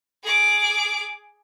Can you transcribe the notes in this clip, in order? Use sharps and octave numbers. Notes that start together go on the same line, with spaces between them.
G#4 D6